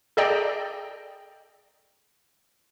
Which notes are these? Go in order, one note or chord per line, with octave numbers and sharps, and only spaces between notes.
G#4 A4 D5 D#5 G5 A#5